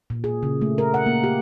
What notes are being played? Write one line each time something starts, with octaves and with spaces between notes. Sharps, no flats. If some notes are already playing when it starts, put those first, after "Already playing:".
A#2
G#4
C#3
A3
A#4
F#5
A#3
G4